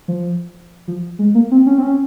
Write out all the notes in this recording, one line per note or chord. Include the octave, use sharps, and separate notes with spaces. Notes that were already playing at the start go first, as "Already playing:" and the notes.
F3
F3
G#3
A#3
C4
C#4
C4
C#4